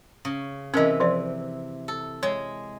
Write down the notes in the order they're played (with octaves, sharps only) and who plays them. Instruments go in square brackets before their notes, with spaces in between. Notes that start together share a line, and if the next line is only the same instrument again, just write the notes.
[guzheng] C#3
[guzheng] C3 E3 [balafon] C#4 A#4 D#5
[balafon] F3 G#4 D5
[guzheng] A4
[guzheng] G#3 [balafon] C#5